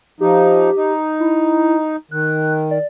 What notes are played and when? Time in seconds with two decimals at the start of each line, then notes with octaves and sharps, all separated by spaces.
0.20 F3 D#4 G4
0.76 D#4
1.20 E4
2.11 D#3 F#6
2.71 D5